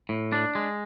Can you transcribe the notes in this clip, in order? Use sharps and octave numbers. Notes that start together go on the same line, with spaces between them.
A2
D4
G#3